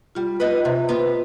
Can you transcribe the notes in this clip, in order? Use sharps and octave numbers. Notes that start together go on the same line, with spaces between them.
G3 F4
B3 D#4 B4 D#5
C3
D#3 B3 F4